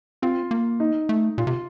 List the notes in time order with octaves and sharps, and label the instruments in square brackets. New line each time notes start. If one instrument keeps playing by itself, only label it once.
[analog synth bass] C4 [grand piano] F4
[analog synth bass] A#3
[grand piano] D#4
[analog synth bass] A3
[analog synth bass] A#2 [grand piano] F4
[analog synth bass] C3